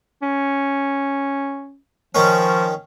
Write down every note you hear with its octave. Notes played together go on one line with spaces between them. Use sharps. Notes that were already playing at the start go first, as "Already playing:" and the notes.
C#4
D#3 F3 C#4